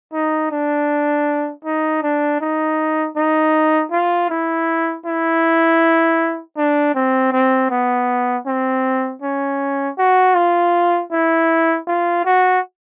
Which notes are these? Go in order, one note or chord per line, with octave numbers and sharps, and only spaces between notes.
D#4
D4
D#4
D4
D#4
D#4
F4
E4
E4
D4
C4
C4
B3
C4
C#4
F#4
F4
E4
F4
F#4